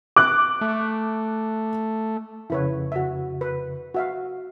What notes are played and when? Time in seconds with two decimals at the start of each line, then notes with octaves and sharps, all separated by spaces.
0.16 D6 F#6
0.61 A3
2.50 F2 C#3 E4 B4 C#5
2.92 F#4 E5
3.41 B4
3.94 F#4 E5 F5